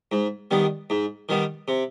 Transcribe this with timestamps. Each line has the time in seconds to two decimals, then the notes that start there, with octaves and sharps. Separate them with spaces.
0.12 G#2
0.51 D#3 G3 B3
0.90 G#2
1.29 D#3 G3 B3
1.68 C3